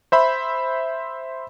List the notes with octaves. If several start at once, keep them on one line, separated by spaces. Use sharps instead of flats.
C5 E5 B5